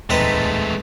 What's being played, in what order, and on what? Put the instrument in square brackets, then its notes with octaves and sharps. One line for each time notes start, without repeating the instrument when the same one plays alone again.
[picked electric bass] D1 E2 A#2 [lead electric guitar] G#3 A3 [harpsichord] C4 D#4 B4